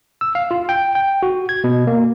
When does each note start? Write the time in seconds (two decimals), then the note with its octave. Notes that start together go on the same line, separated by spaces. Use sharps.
0.21 E6
0.35 F5
0.51 F4
0.69 G5
0.95 G5
1.23 F#4
1.49 G#6
1.64 B2
1.87 A#3